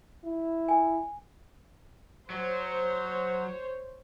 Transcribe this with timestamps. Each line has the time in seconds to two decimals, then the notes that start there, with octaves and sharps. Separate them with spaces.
0.24 E4
0.68 G#5
2.30 F#3 C5 C#5